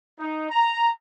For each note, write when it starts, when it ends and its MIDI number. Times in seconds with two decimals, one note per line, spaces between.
0.19 0.46 63
0.50 0.91 82